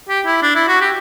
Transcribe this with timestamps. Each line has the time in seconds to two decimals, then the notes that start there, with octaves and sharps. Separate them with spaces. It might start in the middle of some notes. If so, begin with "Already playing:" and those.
0.09 G4
0.26 E4
0.42 D4
0.55 E4
0.68 F#4
0.81 G4